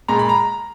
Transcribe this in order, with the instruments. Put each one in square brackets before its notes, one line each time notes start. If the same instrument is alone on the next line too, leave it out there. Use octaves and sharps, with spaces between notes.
[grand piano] A#2 G#3 A#5
B5
A#5